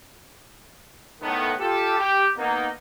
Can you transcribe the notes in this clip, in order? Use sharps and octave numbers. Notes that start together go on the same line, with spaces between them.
A2 D#3 A3 B3
F4 G4 A4
G4
A#3 B3 D#4